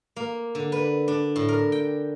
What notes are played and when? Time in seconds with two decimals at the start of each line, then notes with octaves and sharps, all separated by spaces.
0.16 A#3
0.55 D3
0.72 B4
1.08 D4
1.36 A2
1.49 A#4
1.72 G5